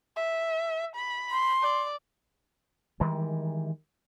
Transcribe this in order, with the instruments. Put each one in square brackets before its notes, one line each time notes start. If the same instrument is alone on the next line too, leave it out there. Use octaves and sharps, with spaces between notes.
[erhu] E5
B5
[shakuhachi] C6
[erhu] D5
[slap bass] D#3 E3 G3 G#3